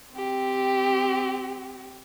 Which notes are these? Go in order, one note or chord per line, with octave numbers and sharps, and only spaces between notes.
C4 G4